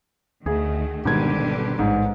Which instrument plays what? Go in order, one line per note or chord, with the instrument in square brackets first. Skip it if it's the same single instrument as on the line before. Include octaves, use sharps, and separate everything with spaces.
[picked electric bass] D2 [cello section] D#3 A3 [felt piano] G#4
[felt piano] G#1 G#6 [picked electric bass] B2 [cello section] D3 G3 G4
[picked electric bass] B2
[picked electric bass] A1 [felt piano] G#2